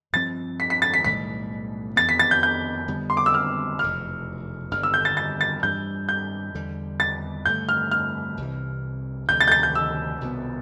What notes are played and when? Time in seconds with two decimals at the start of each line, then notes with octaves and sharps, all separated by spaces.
0.13 G2 F3 C4 A6
0.60 B6
0.70 B6
0.82 A6
0.94 B6
1.04 B1 A2 E3 G3 B6
1.96 F2 E3 B3 A6
2.09 B6
2.19 A6
2.31 G6
2.43 G6
2.88 F2 D3 G3 B3
3.10 C6
3.17 D6
3.26 E6
3.34 F6
3.79 F1 E2 B2 F6
4.71 G1 G2 D3 G3 F6
4.83 E6
4.94 G6
5.05 A6
5.17 A6
5.41 A6
5.63 G2 E3 G3 D4 G6
6.09 G6
6.55 E2 D3 G3
7.00 A6
7.45 G2 D3 A3 G6
7.69 F6
7.91 F6
8.37 C2 C3 E3
9.29 D2 C3 F3 G6
9.41 A6
9.48 G6
9.52 A6
9.63 G6
9.75 E6
10.21 C2 B2 G3 B3